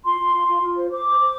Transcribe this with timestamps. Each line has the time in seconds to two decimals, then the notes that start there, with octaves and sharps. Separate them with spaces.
0.06 F4 C6
0.19 F4
0.34 F4
0.48 F4
0.62 F4
0.77 C5
0.90 C5 D6
1.05 C5
1.20 C5